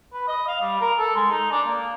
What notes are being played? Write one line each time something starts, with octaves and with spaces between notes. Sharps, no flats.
B4
D#5
F5
G3
A#4
A4
G#3
D#4
D4
A#3